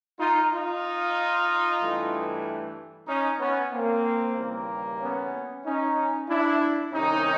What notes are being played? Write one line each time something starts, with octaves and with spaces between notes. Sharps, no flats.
D#4 F4
D#4 F4
G2 E3 A3
C#4 D#4
B3 C#4
A#3 C4
D#2 C#3 E3 G3 A#3
B3 C#4
C#4 D#4
D4 E4
C2 C3 D#3 C#4 D#4